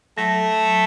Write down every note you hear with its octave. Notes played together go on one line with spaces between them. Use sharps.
F#3 A3